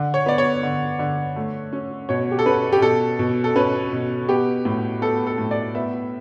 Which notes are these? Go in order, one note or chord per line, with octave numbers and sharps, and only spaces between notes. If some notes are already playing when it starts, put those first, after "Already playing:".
Already playing: D3
C#5
B3 D5
C#5
D3
D3
A3
C#4
B2 C#5
G4
A4
C#4 B4
G4
B2 A4
B2
A4
C#4 B4
B2
B3 G4
A2
B3 A4
A4
A2
D5
B3 E5